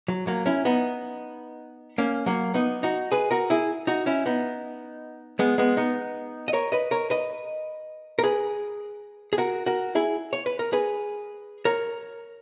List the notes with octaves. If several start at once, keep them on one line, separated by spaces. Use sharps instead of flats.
F#3
F#3 A#3
C#4 E4
B3 D#4
A#3 C#4
F#3 A#3
B3 D#4
D#4 F#4
G#4 B4
F#4 A#4
E4 G#4
D#4 F#4
C#4 E4
B3 D#4
G#3 B3
G#3 B3
B3 D#4
D#5
A#4 C#5
B4 D#5
A#4 C#5
B4 D#5
A#4
G#4 B4
G#4
F#4 A#4
F#4 A#4
E4 G#4
C#5
B4
A#4
G#4 B4
A#4 C#5